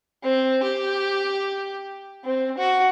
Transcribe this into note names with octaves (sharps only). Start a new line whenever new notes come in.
C4
G4
C4
F#4